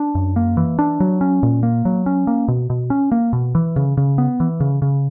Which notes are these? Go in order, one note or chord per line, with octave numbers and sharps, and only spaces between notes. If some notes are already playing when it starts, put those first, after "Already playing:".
Already playing: D4
F#2
A#3
E3
D4
F#3
C#4
A#2
A#3
F#3
C#4
A#3
B2
B2
C#4
A#3
B2
E3
C#3
C#3
B3
E3
C#3
C#3